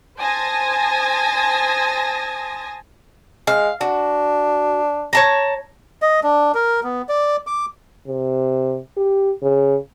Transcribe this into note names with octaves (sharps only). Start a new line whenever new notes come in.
C5 G#5 A5 D#6 G#6 A#6
G#3 F5
D4 F#4
C#5 A5 A#5
D#5
D4
A#4
B3
D5
D6
C3
G4
C#3